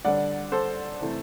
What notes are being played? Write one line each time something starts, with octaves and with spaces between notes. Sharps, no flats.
D3 G3 D4 D5 F#5
A4 C5
C3 E3 A3